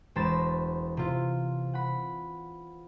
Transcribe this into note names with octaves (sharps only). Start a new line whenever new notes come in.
E1 C5 A#5 B5 A6 E7
C3 F4
F#5 B5